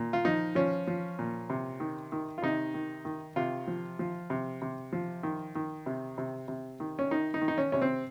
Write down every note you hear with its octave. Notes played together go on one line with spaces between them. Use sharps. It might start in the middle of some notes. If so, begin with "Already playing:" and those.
Already playing: A#2
F4
F3 D#4
F3 C#4
F3
A#2
C3
D#3
D#3
F4
C3 D#4
D#3
D#3
C3 F4
F3
F3
C3
C3
F3
D#3
D#3
C3
C3
C3
D#3
C#4
D#3 D#4
D#4
D#3
D#4
C#4
C3 C#4
C4